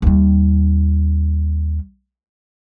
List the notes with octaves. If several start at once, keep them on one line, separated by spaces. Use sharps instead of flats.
D#2 G3